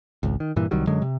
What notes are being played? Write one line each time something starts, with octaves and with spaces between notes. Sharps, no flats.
G#1 C#2
D#3
G2 A#2 E3
C2 D#3 F#3 G3
F#2 D3 F#3 G#3
C3